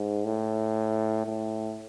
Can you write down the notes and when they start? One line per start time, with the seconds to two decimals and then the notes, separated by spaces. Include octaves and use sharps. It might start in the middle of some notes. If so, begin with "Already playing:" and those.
Already playing: G#2
0.25 A2
1.27 A2